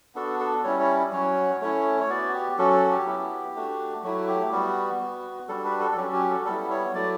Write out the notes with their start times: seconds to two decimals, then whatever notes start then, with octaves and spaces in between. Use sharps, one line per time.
0.15 B3 D4 F#4 A4
0.40 A4
0.64 G3 C#4 E4 C#5
0.80 C#5
1.12 F#3 C#4 F#4 C#5
1.61 A3 C#4 E4 C#5
2.01 C#5
2.09 B3 F#4 D5
2.34 G4
2.58 F#3 C#4 F#4 A4
2.73 A4
2.91 G4
3.06 B3 E4
3.55 A3 D4 F#4
4.03 F#3 A3 E4 F#4
4.28 G4
4.52 G3 B3 F#4
5.00 B3 F#4
5.48 G3 D4 F#4 A4
5.65 B4
5.81 A4
5.91 A4
5.97 F#3 C#4 F#4 G4
6.13 G4
6.30 A4
6.45 G3 B3 E4 A4
6.70 C#5
6.94 F#3 A3 E4 D5